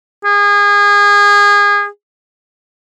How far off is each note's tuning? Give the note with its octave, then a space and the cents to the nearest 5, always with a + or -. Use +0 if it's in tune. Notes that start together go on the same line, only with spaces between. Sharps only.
G#4 -30